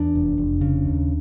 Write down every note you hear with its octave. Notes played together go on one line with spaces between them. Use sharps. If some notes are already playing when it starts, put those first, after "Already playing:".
Already playing: E2 D4
F1
F1
C#3
D#2